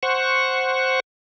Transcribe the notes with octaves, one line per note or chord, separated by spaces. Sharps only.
C5 F#5 C#6